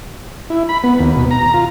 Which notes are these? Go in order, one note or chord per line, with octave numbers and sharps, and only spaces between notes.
E4
B5
B3
D#2
B2
A#5
F4